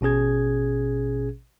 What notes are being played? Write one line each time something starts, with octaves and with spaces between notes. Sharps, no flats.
A1 B2 C#4 G#4 G#6